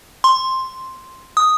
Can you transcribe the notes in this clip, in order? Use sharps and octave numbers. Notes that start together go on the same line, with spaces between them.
C6
D#6